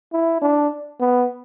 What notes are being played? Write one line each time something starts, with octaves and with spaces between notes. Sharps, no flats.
E4
D4
B3